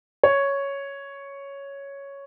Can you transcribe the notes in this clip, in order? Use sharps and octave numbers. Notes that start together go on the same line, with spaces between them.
C#5